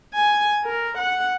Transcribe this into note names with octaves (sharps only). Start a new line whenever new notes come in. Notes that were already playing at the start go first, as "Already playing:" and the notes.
G#5
A#4
F#5